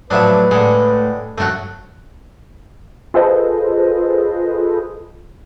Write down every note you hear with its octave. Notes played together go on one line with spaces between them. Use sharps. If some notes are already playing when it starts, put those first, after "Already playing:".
A2 F3 F#3 D4 B4 E5
A2 D3 G#3
G2 D3 F#3 A3 F#4
F4 G#4 A4 B4 C5 D#5